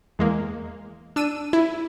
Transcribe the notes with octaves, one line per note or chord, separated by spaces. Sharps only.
E2 G#3 A#3
D4 E6 D#7
E4